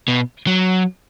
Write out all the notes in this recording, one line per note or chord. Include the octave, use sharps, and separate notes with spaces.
B2
F#3